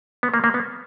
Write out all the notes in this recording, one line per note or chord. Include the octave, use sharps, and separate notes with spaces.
B3
A#3
A#3
B3